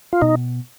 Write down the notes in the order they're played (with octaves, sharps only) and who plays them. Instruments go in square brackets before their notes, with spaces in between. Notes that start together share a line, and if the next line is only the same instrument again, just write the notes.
[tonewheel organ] F4
[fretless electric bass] B2 [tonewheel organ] D#4